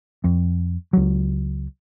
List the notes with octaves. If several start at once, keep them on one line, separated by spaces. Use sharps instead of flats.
F2
C#2 F#3